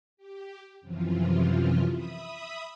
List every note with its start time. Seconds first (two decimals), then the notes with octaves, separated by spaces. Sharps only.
0.17 G4
0.81 F#2 C3 E3 F3 F4
1.91 E5 B5 D#6